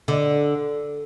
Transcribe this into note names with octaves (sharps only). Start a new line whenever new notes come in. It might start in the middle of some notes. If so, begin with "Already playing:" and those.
D3